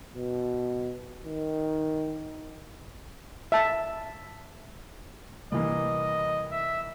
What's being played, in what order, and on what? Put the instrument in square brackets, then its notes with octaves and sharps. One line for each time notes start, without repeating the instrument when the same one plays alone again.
[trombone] B2
D#3
[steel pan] E5 A5
[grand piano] C2 E3 A#3 [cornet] D#5
[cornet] E5